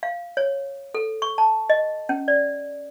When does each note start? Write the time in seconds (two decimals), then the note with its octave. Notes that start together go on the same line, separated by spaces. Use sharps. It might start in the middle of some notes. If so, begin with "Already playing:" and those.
0.03 F5
0.37 C#5
0.94 A4
1.22 C#6
1.38 A5
1.70 D#5
2.09 C#4
2.28 D5